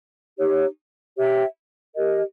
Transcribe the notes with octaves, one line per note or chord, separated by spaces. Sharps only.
D#4 G4 C#5
G4 C#5 E5 G5
G4 A#4 D#5